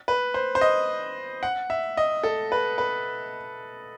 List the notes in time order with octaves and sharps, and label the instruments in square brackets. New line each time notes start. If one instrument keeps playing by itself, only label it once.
[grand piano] B4
C5
C5
D#5
F#5
E5
D#5
A4
B4
B4